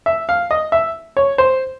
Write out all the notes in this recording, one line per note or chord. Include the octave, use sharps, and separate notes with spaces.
E5
F5
D#5
E5
C#5
C5